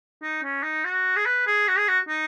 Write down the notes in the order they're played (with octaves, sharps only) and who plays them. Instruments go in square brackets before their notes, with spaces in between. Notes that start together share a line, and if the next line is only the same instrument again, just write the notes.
[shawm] D#4
C#4
D#4
F#4
G#4
B4
G#4
F#4
G#4
F#4
D#4